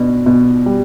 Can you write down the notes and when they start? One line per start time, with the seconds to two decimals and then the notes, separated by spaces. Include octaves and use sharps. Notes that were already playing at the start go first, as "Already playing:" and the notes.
Already playing: B2 D4
0.26 B2
0.66 G3